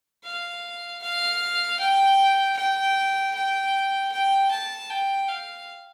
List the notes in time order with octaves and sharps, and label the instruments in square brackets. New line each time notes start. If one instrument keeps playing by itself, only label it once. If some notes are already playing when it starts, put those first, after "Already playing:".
[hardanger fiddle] F5
F5
G5
G5
G5
G5
A5
G5
F5